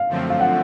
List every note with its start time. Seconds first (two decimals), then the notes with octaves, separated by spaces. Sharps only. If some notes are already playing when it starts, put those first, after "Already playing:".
Already playing: F5
0.08 F#2 D3 F3 A3 C4
0.30 F5
0.40 F#5